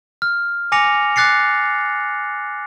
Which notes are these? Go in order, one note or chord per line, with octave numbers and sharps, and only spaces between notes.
F6
G#5 D6 A#6 C#7 F7
D6 F#6 A6 C7 C#7